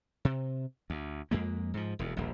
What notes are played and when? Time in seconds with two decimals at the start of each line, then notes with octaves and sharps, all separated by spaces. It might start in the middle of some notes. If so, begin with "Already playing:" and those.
0.25 C3
0.90 D2
1.31 F2 G#3 A#3
1.74 G#2 F3
1.99 E1 D#2
2.17 D#1 A#1